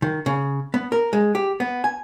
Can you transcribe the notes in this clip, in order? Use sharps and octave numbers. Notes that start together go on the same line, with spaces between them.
D#3
C#3
B3
A#4
G#3
G4
B3
G#5